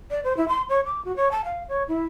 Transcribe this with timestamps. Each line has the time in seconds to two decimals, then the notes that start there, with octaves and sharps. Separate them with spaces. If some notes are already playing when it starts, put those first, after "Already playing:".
0.10 D5
0.24 C5
0.37 E4
0.48 C6
0.69 C#5
0.86 D6
1.05 F#4
1.16 C#5
1.31 A5
1.45 F5
1.69 C#5
1.88 E4